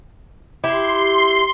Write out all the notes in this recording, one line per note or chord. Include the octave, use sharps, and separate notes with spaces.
E4 G4 C6